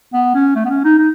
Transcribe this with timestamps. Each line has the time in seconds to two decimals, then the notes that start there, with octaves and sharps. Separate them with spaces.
0.14 B3
0.35 C#4
0.56 A3
0.65 B3
0.70 C#4
0.84 D#4
0.98 D#4